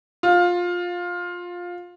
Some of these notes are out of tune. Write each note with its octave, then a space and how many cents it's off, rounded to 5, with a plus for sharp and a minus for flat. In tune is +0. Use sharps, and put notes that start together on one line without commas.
F4 +15